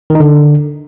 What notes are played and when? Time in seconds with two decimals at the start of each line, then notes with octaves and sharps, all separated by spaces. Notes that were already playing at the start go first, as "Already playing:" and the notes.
0.10 D#3
0.15 D#4
0.20 D3